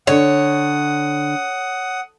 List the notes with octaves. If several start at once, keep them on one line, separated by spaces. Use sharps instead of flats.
D3 D4 A4 C#5 D5 F#5 D#6